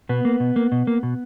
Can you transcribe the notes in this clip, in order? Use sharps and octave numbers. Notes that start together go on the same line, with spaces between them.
B2 B3
A#3
B2
A#3
B2
A#3
B2